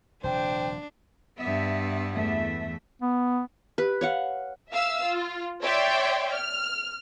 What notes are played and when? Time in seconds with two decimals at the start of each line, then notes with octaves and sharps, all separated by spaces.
0.24 D#1 C3 F3 D4 C5 G5
1.39 G2 B3 E5
2.12 E2 A3 E5
3.02 B3
3.78 G4 B4
4.01 C#5 F5 F#5
4.70 E5 F5 E6
5.04 F4
5.62 C#5 D5 E5 G5 C6
6.32 F6